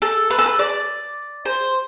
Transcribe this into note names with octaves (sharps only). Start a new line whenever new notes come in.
A4
B4
A4
B4
D5
C5